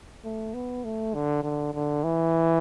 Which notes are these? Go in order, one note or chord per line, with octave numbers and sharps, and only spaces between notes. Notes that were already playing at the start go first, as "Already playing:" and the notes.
A3
B3
A3
D3
D3
D3
E3